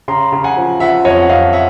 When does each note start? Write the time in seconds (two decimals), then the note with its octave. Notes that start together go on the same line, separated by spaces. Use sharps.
0.08 C#3 A#5 C6
0.32 C#3
0.44 F#5 G#5
0.57 F3
0.80 F3 E5 F#5
1.04 F2 C#5 D#5
1.22 F#5
1.29 F2 D#5 F5
1.53 E5 F#5